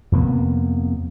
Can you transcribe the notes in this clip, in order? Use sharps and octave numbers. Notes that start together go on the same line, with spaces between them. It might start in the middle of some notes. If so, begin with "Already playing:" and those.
F2 C3 A#3 B3